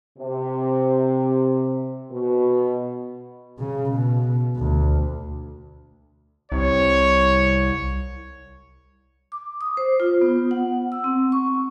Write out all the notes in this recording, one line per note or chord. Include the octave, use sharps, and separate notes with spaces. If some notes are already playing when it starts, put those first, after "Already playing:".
C3
B2
C#3
B2
D2
C2 C#5
D6
D#6
C5
F4
B3
F#5
E6
C4
C#6